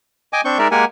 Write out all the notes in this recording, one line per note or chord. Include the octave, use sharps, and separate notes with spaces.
D#5 G5 G#5 D6
C4 D4 C#6 G6
G#3 D#4 A#4 D5 E5
G#3 A#3 G4 A#4 F#5 G#5